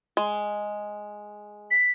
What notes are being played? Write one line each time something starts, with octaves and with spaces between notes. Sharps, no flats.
G#3
B6